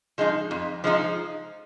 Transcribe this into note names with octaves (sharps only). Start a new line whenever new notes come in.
F3 G#3 D#4
F2
F3 G#3 D#4